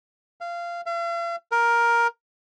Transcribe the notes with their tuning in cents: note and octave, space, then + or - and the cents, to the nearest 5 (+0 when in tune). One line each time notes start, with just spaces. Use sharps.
F5 -20
F5 -45
A#4 +10